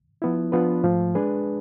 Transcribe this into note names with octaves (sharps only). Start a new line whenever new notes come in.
F3 B3 E4
F3 B3 D4 F4 B4
G#2 F3 A3
G#3 D4 G#4 B4